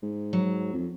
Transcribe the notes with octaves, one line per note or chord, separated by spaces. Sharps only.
G#2
F#3
F2